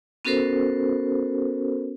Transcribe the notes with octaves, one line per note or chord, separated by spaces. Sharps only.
B3 C#4 F#4 A4 A#4 C5